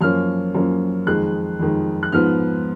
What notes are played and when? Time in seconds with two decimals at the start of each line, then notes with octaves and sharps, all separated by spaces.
0.01 F#2 F3 A#3 C#4 F6
0.55 F#2 F3 A#3 C#4
1.07 F2 D#3 G#3 F#6
1.60 F2 D#3 G#3
2.03 F#6
2.12 G#2 F3 B3 F6